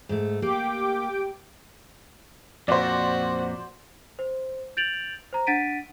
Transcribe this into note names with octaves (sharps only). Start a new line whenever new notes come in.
G#2 A3
A#3 G4 G5 D6
F2 A#2 F#4 C5 D5
C5
G6 A6 D7 F7 F#7
C5 A#5
D4 F#5 A6 B6 D7 D#7